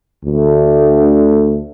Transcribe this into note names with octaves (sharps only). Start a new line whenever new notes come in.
D2 D3 A3